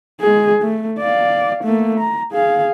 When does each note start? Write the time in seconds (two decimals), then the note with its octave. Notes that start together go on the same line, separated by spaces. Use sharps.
0.20 G#3 G#4
0.62 A3
0.99 D5 F5
1.64 A3 A#3
2.00 A#5
2.32 G#4 F5